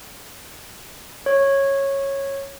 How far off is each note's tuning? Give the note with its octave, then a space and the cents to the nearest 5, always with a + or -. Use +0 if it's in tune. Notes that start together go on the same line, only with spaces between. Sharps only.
C#5 -10